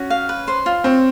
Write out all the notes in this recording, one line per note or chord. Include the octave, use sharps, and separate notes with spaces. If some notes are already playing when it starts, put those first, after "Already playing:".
Already playing: C#4 F#4
F5
B4
C5
F4
C4 C#5